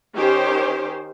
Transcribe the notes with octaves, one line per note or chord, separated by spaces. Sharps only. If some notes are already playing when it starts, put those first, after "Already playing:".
D#3 C#4 G4 C5